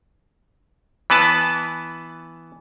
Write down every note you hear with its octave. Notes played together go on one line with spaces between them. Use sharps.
E3 B3 B4 A5